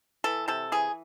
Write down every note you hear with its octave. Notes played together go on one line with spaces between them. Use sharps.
E3 A4
C3 A4
E3 G#4